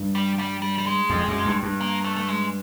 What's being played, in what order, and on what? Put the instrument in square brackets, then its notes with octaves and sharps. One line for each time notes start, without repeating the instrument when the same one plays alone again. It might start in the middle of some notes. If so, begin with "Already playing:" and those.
Already playing: [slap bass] G2
[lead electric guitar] G3
G3
G3
G3
G#3
[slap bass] F2
F#2
G2
G2
[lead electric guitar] A#3
A3
A3
G#3